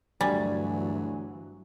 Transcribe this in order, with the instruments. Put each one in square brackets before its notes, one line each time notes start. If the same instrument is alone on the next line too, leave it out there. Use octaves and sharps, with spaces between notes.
[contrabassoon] D2 [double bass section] G2 E3 F#3 [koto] G3 [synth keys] G#5